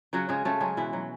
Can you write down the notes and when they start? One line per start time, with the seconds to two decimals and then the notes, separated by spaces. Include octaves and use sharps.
0.13 C#3 F#3 F#4
0.29 C#3 G#3 G#4
0.45 C#3 A3 A4
0.61 F#3 G#3 G#4
0.77 B2 E3 E4
0.93 F#3